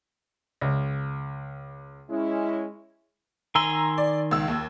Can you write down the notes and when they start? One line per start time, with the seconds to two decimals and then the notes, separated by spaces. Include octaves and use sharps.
0.61 C#2
2.10 G#3 C#4 E4
3.55 D#3 G#5 A#5 C6 E6
3.98 D5
4.31 C#2 E6
4.48 D#2